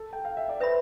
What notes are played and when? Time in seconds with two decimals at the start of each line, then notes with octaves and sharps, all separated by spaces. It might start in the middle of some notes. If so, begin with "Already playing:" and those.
Already playing: A4
0.13 G5
0.25 F5
0.37 E5
0.49 D5
0.60 B4 C5 E5 B5